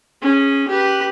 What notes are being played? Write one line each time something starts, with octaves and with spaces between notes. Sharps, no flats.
C#4 G#4
G4 B4